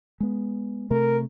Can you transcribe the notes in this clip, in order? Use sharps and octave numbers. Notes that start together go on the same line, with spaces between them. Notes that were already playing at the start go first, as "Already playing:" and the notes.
G#3 B3
C3 A3 A#4